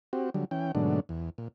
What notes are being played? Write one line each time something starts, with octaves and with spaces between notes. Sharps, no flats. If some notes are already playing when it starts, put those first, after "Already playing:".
C4 F#4 G4
D3 F#3 G3
E3 C#4 G5
G#2 B2 D3 F#3 A3 D4
E2
A#2